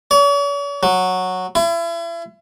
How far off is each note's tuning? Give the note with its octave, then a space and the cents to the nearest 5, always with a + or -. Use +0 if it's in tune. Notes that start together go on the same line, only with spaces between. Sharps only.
C#5 +45
F#3 -5
E4 +40